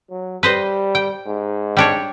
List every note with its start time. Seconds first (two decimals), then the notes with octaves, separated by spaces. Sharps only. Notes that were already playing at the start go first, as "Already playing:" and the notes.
0.11 F#3
0.43 G3 B4 C5 D#5
0.95 G5
1.26 G#2
1.77 G3 D4 C#5